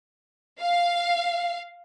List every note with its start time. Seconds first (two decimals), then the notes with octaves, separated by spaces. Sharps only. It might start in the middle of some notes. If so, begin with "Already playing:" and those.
0.61 F5